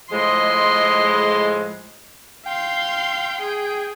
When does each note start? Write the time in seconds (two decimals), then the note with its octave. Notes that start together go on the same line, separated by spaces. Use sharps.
0.12 A2 F3 G#3 D#5 C6
2.46 F5 G5 C6
3.41 G#4